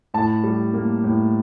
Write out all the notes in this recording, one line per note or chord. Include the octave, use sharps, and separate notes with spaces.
A2 A5
G3
A#3
A2